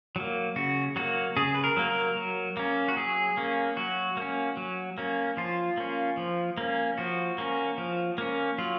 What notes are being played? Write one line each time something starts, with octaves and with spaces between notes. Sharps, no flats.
F#3 A#3
C#3 F#4
F#3 A#3 F#4
C#3 G#4
B4
A#4
F#3 A#3
A#4
F#3
A#3 C#4
F#4
F#3 G#4
A#3 C#4
F#3 F#4
A#3 C#4
F#3
A#3 C#4
F3 F4
A#3 C#4
F3
A#3 C#4
F3 F#4
A#3 C#4
F3
A#3 C#4
F#3 F4